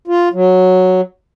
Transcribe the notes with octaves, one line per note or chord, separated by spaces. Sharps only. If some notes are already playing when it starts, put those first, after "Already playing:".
F4
F#3